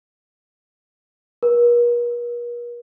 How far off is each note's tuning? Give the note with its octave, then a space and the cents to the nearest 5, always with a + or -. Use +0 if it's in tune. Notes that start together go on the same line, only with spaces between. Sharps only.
A#4 +45